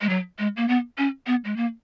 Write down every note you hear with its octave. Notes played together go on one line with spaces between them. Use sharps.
G#3
F#3
G#3
A#3
B3
C#4
B3
G#3
A#3